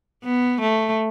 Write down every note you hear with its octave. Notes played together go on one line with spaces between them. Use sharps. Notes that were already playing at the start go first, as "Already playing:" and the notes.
B3
A3